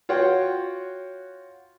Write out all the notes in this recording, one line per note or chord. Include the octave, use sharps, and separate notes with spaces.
F4 F#4 C#5 F#5 G5